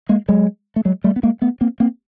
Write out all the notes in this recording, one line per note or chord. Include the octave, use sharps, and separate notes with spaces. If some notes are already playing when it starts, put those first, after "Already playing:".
G#3 A#3
F#3 G#3
A3
F#3 G#3
G3 A3
B3
G#3 A#3
A3 B3
A#3 C4
A#3 C4